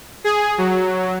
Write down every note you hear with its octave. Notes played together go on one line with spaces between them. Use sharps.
G#4
F#3